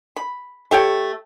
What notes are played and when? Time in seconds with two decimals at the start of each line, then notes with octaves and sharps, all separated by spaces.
0.16 B5
0.71 A3 G4 C#5 G5